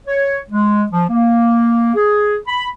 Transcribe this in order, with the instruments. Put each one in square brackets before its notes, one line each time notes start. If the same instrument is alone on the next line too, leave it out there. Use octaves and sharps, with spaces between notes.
[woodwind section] C#5
G#3
F3
A#3
G#4
B5